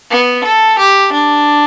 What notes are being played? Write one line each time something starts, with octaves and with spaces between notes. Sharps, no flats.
B3
A4
G4
D4